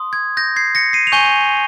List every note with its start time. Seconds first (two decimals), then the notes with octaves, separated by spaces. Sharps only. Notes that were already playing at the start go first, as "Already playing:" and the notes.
Already playing: C6 D#6
0.13 G#6
0.37 G6 A#6
0.56 G#6 C7
0.75 A#6 C#7
0.93 C7 D#7
1.07 F7
1.12 G#5 C#6 G6 D#7 G7